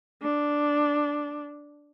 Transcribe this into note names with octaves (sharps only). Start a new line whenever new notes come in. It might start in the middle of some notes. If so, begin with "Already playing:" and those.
D4